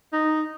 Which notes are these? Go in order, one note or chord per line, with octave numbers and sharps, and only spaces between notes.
D#4